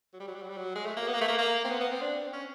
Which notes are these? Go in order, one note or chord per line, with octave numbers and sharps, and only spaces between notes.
F#3
G3
F#3
G3
F#3
G3
F#3
G#3
A3
A#3
B3
A#3
A3
A#3
A#3
C4
B3
B3
C4
D4
C4
C#4